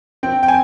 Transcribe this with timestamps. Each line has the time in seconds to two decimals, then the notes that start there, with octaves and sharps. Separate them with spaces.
0.23 C4 G5
0.43 G5
0.48 G#5